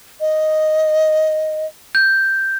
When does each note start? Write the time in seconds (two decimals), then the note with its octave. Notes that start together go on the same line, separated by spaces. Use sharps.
0.20 D#5
1.95 G6